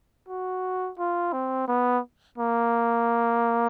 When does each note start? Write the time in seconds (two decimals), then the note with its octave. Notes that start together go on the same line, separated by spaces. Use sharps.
0.28 F#4
0.99 F4
1.33 C4
1.68 B3
2.38 A#3